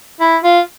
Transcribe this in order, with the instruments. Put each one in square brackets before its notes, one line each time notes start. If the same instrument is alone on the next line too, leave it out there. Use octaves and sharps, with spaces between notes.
[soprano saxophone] E4
F4